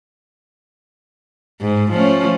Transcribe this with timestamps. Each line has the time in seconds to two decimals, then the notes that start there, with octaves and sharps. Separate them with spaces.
1.61 G#2
1.92 F3 A3 C#4